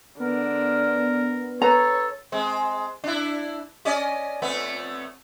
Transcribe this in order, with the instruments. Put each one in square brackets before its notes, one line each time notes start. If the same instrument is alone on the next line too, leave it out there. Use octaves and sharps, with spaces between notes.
[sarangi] D3 [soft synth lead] B3 [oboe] A#4
[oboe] A4 [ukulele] B4 A#5 [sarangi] C#5
[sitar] G#3 C4
D4 E4
C#4 D5 D#5
F2 A3 B3